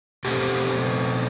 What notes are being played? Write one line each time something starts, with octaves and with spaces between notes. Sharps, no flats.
B2 A3 C4 G4